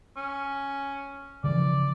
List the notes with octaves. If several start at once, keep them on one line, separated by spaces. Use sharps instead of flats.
C#4
C#3 E3 F3 D5